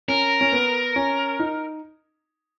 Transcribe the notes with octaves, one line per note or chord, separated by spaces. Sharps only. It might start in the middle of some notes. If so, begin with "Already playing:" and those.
C#4 A#4
C#4
B3
C#4
D#4